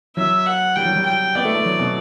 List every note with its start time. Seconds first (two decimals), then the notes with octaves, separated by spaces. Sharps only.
0.16 F#3 E5
0.46 F#5
0.75 G3 G5
0.85 F#3
0.96 G3
1.06 G5
1.35 B3 D5
1.45 A3
1.55 A3
1.65 F#3
1.79 B2